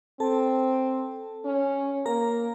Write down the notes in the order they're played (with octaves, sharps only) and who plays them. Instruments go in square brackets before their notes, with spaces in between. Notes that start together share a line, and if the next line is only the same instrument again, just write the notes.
[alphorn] C4 [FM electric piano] A4 A5
[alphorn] C#4
[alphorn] A#3 [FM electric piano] A#4 A#5